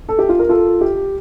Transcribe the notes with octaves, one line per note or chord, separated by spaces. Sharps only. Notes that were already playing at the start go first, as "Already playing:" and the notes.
A4
G4
F4
A#4
F4 A4
G4